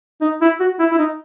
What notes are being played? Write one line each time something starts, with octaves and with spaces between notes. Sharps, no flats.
D#4
E4
F#4
E4
E4
D#4